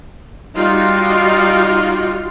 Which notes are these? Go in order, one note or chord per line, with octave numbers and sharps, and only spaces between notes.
G3 D#4 F4 F#4